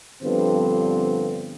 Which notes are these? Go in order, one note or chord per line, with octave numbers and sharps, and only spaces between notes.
G2 D3 F3 B3 C4